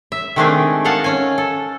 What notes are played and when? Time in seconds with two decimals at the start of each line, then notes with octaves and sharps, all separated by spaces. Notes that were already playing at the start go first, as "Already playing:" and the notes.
0.12 E5
0.36 D#3 G#3 A3 C4 D4 G#4
0.85 A4 A#4 D#5 F5 F#5 A5
1.04 C#4 G#5
1.38 A4